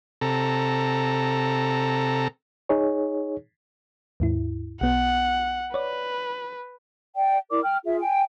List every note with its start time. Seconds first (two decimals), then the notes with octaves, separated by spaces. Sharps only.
0.21 C3 A4 A#5
2.69 D#4 G#4 C#5
4.20 D#2 G#2 E4
4.81 B1 B3 F#5
5.74 B4 C#5 D5
7.16 D5 G5
7.51 E4 A#4 D5 D6
7.63 G5 F6
7.85 F4 G#4 E5
8.00 G5 G#5